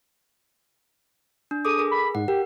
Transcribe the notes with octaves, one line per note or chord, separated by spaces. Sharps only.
D4
G#4 A4 D6 D#6
G#4 A#4
B5
G#2 F#5
G4 A#4